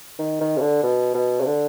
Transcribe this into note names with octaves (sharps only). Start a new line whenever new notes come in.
D#3
D#3
C3
D3
B2
B2
C3
D3